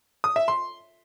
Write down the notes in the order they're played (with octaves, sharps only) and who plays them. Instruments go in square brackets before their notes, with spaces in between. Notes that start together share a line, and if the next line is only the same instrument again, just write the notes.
[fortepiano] D#6
E5
C6